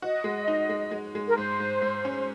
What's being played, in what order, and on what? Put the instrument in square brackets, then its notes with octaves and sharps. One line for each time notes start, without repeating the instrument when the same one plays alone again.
[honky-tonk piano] F#4 [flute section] D#5
[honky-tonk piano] G#3
D#4
G#3
G#3
G#3
[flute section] A#4
[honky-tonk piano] G#2 [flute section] C5
[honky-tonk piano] G#2
G#2
C#4